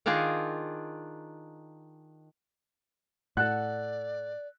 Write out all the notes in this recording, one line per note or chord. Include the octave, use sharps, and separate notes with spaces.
D#3 D4 D#4 F4 G#4
A2 A4 D5 F#5 F#6